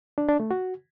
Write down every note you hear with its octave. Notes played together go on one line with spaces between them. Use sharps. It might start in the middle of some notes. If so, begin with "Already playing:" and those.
D4
D4
A3
F#4